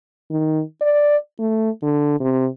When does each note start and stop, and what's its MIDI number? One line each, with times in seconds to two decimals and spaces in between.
0.31 0.62 51
0.82 1.17 74
1.39 1.70 57
1.83 2.16 50
2.20 2.47 48